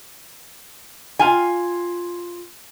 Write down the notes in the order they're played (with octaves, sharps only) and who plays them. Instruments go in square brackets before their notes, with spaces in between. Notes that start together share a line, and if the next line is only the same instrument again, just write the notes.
[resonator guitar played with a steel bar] F4 G#5